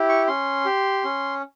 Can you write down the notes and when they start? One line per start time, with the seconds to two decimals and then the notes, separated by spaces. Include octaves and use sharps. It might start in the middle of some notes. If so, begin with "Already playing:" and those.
Already playing: E4 G4
0.09 C#6
0.27 C#4 C6
0.65 G4
1.04 C#4